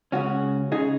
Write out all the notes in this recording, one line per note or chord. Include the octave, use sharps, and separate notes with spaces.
C#2 C#3 C#4 F#4
C#3 D#4 G#4